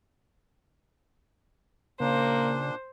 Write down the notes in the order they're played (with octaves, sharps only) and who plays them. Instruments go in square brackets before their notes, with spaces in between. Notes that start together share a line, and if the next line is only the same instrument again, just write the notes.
[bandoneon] A#2 D4 [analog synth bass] C#3 [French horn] A#3 [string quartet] C5